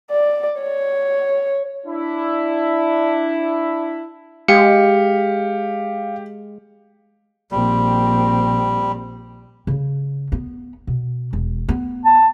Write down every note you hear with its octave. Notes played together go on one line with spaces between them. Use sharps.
D5
C#5
D4 E4
G#3 G4 F5 C#7
A#1 G3 C4
C#3 C#4
B3
B2
E1
B3
A5